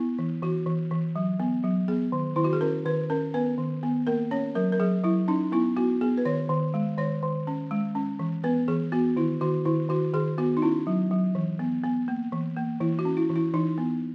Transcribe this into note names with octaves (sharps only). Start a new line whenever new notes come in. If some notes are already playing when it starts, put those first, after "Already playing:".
Already playing: B3 E4
E3
E3 F#4
E3
E3
F#3
B3
F#3
B3 G#4
D#3
D#3 E4
F#4
G#4
C#4 A#4
D#3 B4
C#4 A#4
B3 B4
D#3
B3
A#3 A#4
C#4 C#5
F#3 A#4
A#4
F#3 G#4
F#3 E4
C#4 D#4
B3 E4
B3 F#4
B3 G#4
B4
D#3 C#5
D#3
G#3
D#3 C#5
D#3
C#4
G#3
C#4
E3
B3 B4
E3 G#4
B3 F#4
D#3 E4
D#3 F#4
D#3 E4
D#3 F#4
D#3 G#4
B3 F#4
D#4
C#4 E4
F#3
F#3
E3
B3
B3
A#3
E3
A#3
E3 E4
F#4
C#4
E4
E3
E4
E3 D#4
B3